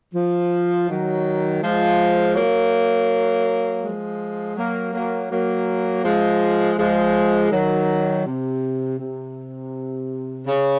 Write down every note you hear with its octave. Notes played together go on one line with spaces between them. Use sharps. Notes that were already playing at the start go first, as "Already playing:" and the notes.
F3
D#3 F#3
F3 G#3
F#3 A#3
F3 G#3
F#3 A#3
F#3 A#3
F#3 A#3
F3 G#3
F3 G#3
D#3 F#3
C3
C3
C#3